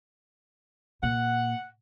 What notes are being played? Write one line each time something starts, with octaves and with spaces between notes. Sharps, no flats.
A#2 F#5